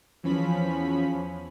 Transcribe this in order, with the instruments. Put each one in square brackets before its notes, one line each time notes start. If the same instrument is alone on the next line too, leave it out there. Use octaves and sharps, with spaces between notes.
[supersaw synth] E2 F3 C#4 B5 B6